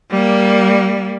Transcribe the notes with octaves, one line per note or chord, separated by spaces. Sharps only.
G3 A#3